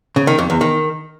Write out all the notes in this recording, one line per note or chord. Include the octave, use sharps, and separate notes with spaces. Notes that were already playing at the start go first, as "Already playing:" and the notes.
C#3
D#3
F2
E2
D#3